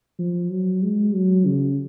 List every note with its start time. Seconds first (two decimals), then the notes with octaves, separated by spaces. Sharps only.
0.19 F3
0.50 F#3
0.83 G#3
1.15 F#3
1.46 C#3